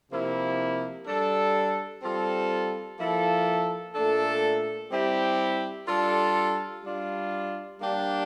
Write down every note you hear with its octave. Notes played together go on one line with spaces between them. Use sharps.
C3 F3 A#3 E4
G3 D4 A4
G3 C4 F4 A4
F3 A#3 E4 A4
A#2 A3 D4 A4
G3 C4 E4 G4
G3 D4 F4 A4
G3 D4 F4
G3 A#3 D4 G4